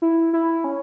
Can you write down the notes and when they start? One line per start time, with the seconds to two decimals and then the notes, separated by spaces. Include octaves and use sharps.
0.02 E4
0.33 E4
0.64 C#4